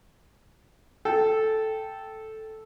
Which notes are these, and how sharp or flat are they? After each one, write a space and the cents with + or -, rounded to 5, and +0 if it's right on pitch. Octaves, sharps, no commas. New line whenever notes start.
A4 -5 G5 +0